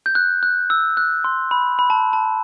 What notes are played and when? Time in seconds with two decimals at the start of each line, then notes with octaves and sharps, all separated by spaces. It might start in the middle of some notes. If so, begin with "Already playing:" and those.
0.06 G6
0.15 F#6
0.43 F#6
0.70 E6
0.97 F#6
1.24 C6
1.51 B5
1.79 B5
1.90 A5
2.13 A5